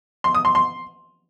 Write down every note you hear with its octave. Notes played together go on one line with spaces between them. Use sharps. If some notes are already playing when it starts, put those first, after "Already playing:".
C6
D#6
C6
C6